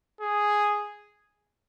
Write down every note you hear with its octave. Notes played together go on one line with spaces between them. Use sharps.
G#4